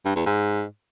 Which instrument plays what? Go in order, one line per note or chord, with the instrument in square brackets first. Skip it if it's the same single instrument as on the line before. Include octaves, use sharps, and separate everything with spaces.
[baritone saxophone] G2
E2
G#2